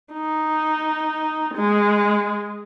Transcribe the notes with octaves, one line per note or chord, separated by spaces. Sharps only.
D#4
G#3